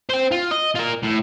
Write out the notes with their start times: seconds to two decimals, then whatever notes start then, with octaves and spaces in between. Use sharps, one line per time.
0.10 C5 G5
0.32 F4
0.51 D#5
0.76 F4 A#4
1.03 A2